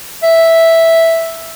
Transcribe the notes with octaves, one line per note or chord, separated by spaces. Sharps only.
E5